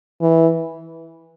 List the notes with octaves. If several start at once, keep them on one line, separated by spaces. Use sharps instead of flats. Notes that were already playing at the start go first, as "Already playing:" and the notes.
E3